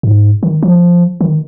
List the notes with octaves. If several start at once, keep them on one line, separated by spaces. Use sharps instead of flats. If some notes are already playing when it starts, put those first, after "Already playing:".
G#2
D#3
F3
D#3